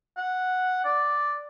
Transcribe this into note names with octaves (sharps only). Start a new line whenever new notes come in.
F#5
D5